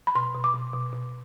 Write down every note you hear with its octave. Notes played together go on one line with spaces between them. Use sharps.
B5
B2 C6
B2
D6
B2
B2
B2